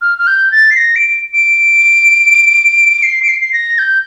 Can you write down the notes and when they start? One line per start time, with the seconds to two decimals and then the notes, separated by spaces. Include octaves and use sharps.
0.02 F6
0.18 F6
0.27 G6
0.52 A6
0.71 C7
0.77 A#6
0.96 D7
1.33 D7
3.03 C7
3.23 D7
3.28 C7
3.41 C7
3.53 A#6
3.78 G6